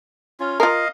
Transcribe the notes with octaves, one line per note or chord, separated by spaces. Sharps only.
C#4 F4
F4 A#4 D#5 F5